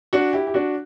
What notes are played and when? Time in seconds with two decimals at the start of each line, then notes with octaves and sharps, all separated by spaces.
0.13 D4 F#4
0.33 E4 G4
0.47 G4
0.54 D4 F#4